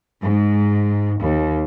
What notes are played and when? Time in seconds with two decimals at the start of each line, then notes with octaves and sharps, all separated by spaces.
0.23 G#2
1.20 D#2